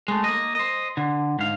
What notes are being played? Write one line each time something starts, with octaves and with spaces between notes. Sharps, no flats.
G#3 A3
A#3 D#5
C5 D#5
D3
G#2 F5